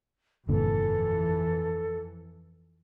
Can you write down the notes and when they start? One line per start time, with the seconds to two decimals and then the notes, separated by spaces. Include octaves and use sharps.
0.49 G1 F2 A#2 D3 E3 A4